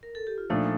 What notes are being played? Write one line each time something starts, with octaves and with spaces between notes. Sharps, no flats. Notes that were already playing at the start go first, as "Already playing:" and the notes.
A#4
A4
G4
F4
A#2 F3 A3 D4 D#4 A4